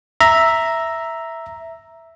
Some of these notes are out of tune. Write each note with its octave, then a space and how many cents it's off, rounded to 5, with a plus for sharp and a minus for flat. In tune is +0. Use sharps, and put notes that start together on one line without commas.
E5 +0 A#5 +0